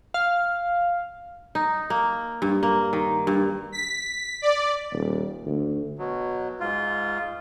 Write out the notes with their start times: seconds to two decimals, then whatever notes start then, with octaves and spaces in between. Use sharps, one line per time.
0.14 F5
1.55 D#4
1.90 A#3
2.42 G2
2.63 A#3
2.93 D#3
3.27 G2
3.72 B6
4.42 D5
4.92 D#1
5.46 D2
5.99 B2 F#3
6.60 G#2 F4